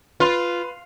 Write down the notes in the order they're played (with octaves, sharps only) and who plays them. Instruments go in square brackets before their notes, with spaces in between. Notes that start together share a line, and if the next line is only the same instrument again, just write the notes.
[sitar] F4 [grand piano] B4